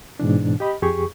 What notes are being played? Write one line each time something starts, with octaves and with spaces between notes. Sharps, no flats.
G#2 B2 E3 D4
G4 D#5 B5
F2 G4 G#4 C#6